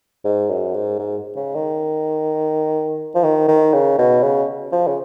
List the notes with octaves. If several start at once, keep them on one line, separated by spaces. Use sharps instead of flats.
G#2
F#2
G#2
G#2
C#3
D#3
F3
D#3
D#3
C#3
B2
C#3
F3
C#3